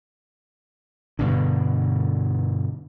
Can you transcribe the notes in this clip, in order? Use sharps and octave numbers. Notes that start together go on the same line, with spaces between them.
G2 B2 D3